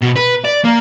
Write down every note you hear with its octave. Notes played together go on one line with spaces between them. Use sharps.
B2
B4
D5
A#3